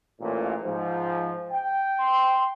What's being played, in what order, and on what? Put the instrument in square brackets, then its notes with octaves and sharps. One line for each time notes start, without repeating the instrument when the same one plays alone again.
[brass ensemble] A1 A#2
G#2 F3
G5
[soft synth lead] C6